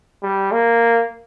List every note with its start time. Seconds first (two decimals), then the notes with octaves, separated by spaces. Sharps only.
0.23 G3
0.52 A#3